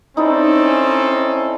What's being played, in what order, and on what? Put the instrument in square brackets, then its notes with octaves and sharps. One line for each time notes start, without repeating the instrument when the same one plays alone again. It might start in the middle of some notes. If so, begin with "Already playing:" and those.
[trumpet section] C4 C#4 A4 [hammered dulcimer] D#4 E4 D5